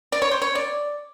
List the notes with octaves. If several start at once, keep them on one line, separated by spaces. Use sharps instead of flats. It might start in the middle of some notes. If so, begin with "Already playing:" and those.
D5
C#5
C5
C#5
D5